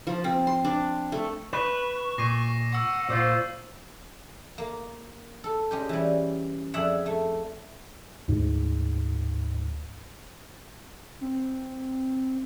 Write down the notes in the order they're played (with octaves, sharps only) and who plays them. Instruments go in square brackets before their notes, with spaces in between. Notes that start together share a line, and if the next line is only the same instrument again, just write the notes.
[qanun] F3
C4
C6
D4
A3
[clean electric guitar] B4 [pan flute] C#6 [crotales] E7
[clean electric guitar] A#2 [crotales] A#6 C7 D#7
[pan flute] F#5 [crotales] C#6 E6
[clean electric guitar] A#2 F4 [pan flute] C5
[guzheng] A#3
A4
G#3 C#4 G4
E3 G3
F2 G#4 D5 E5 F#5
A3
[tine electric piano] D2 G#2
[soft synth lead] C4